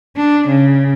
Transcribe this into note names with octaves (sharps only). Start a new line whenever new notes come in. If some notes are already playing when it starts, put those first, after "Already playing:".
D4
C#3